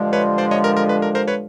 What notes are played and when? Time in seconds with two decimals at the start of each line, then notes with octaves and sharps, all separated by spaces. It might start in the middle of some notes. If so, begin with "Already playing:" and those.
Already playing: G2 D3 F3 G#3
0.13 B4 C#5
0.38 C5 D5
0.51 C#5 D#5
0.64 A#4
0.77 A#4
0.89 B4
1.02 A#4
1.15 A#4 C5
1.28 B4 C#5